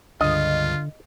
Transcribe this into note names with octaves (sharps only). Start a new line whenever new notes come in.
C#2 G2 D3 F4 D#5